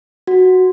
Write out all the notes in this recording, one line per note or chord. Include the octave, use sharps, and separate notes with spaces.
F#4